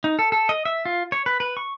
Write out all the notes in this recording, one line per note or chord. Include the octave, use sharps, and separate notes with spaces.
D#4
A4
A4
D#5
E5
F4
C#5
B4
B4
C#6